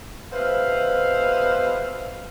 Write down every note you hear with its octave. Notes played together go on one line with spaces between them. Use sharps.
B2 G#3 B4 C5 E5 F5